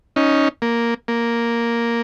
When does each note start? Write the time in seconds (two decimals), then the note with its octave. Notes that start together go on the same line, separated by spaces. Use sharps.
0.16 C#4 D#4
0.62 A#3
1.08 A#3